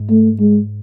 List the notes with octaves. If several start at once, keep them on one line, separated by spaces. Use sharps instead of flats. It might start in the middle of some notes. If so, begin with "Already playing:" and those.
Already playing: G#2
A3
G#3